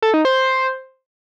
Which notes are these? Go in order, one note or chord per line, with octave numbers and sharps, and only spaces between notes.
A4
D#4
C5